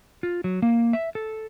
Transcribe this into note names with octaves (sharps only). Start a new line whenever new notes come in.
F4
F#3
A#3
E5
A4